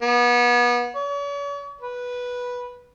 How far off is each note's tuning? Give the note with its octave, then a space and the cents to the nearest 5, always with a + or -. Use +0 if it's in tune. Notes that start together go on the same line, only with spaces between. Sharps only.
B3 -30
C#5 +45
B4 -10